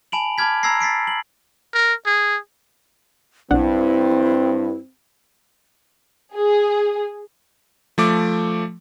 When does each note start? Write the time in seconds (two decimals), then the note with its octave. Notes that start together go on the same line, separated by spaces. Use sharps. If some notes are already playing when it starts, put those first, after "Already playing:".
0.12 G#5 A5 B5 D7 F7 F#7
0.38 A5 B5 D6 F6 G#6 B6
0.63 A#5 B5 E6 G#6 A#6 C7
0.80 A6 B6 C7 D7
1.07 F#7
1.74 A#4
2.06 G#4
3.51 B1 G2 C4 D4 E4 F#5
6.34 G#4
7.98 F3 A3 D6